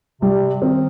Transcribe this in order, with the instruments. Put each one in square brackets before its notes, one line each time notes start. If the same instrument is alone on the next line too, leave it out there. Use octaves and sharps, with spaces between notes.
[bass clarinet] C3 [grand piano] G3
[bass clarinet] D#3 [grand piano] C4